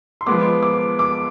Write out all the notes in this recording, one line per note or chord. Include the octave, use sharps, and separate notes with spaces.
C6
F3 G#3 B3 D6
D6
D6